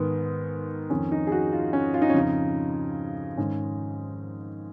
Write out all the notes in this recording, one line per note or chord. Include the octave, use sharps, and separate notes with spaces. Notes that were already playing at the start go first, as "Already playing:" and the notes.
Already playing: G#2 D#3 B3
F2 D#3 C#4
D#4
G#4
F#4
F4
C#4
F4
D#4
C#4
F2 C#3 D#4
G#2 D#3 C#4